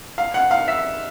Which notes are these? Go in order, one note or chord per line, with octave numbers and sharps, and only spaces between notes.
F5
F#5
F5
E5